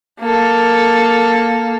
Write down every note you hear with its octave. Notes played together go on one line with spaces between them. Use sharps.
A#3 A4